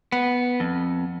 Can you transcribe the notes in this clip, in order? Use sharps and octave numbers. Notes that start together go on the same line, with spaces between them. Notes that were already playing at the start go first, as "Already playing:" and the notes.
B3
F2